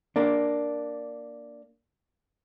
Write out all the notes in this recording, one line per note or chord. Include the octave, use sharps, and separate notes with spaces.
A#3 D4